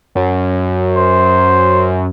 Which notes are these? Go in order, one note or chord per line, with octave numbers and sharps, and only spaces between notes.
F#2
C5